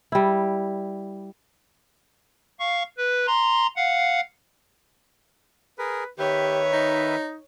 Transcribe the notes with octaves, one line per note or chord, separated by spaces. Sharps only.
G3 E4
F5 C#6
B4
A#5 C6
F5 F#5
G#4 A#4 B4
D#3 G4 B4 C#5 E5
D#4